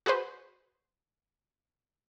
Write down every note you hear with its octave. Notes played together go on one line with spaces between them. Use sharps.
F#4 G#4 B4 C5